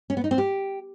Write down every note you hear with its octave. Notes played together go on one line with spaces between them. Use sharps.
C#4
B3
D#4
C4
G4